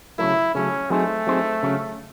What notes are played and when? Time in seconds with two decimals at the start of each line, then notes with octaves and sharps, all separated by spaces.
0.19 C#3 F#3 A3 E4
0.55 C#3 F#3 A3 C#4
0.90 F#3 A3 C4 D#4 G#4 C5
1.27 F#3 C4 D#4 G#4 C5
1.63 C#3 F#3 C#4